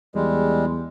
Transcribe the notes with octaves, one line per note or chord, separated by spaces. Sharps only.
E2 G3 G#3